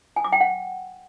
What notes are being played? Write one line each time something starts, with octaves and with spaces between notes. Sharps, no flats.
G#5
D6
G5
F#5